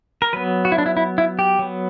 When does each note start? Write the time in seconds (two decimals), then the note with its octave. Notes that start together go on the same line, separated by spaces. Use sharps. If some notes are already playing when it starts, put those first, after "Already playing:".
0.22 A#4
0.33 F#3 B3 B4
0.65 F#4
0.72 E4
0.78 D4
0.86 E4
0.97 E4
1.18 E4
1.39 G4
1.59 F#3 B3